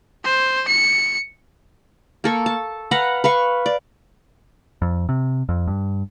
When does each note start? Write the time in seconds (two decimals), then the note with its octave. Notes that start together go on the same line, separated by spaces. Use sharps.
0.24 C5
0.68 C#7
2.24 A#3 A4 C#6
2.46 A5
2.91 B4 F5 F#5 A#5
3.24 B4 F5 C#6
3.66 D5
4.82 F2
5.09 C3
5.49 F2
5.68 G2